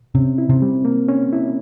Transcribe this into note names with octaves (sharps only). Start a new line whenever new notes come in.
C3 C#4
E4
C3
G3
A#3
C#4
E4